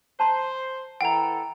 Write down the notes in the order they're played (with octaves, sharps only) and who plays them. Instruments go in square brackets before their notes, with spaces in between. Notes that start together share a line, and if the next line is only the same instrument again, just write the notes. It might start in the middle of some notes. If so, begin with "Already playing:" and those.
[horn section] C5 [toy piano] A5 A#5 C6
[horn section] E3 A4 [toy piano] F#5 [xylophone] G5 A#5